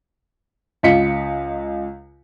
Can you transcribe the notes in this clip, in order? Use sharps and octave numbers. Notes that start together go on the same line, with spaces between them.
C#2 F4 D#5 B6 C#7